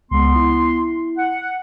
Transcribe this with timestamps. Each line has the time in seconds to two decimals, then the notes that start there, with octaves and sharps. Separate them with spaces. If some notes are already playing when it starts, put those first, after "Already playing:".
0.11 C#2 G#3 B3 C6
0.36 E4
1.18 F#5